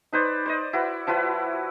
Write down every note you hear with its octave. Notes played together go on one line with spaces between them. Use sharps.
D#4 B4 C5 D5
C5 D5 D#5
E4 F#4 B4
F3 E4 F#4 B4